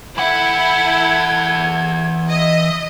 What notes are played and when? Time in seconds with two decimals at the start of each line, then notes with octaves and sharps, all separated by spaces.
0.18 E3 E4 A4 F#5 G6 G#6
2.31 D#5 E5